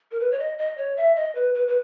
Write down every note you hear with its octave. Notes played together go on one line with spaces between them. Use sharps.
A#4
B4
C#5
D#5
D#5
C#5
E5
D#5
B4
B4
B4